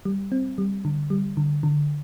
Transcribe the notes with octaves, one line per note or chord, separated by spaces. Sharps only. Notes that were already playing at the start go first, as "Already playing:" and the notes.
G3
C4
G3
D3
G3
D3
D3